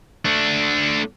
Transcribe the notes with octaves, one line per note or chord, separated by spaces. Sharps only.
A3 D4